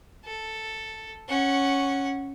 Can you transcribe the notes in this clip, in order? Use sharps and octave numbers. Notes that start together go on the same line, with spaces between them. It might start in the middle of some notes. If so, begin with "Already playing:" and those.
A4
C#4 F#5